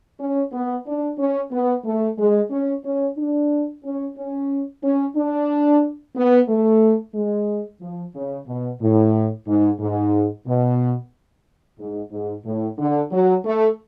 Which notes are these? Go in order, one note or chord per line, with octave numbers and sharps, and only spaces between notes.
C#4
B3
D4
C#4
B3
A3
G#3
C#4
C#4
D4
C#4
C#4
C#4
D4
B3
A3
G#3
F3
C#3
B2
A2
G#2
G#2
B2
G#2
G#2
A2
D3
F#3
A3